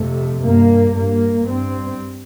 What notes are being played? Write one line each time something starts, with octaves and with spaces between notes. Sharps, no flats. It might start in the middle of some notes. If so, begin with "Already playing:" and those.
Already playing: F2 C3 A3
G2 A#3
G2 A#3
G2 C4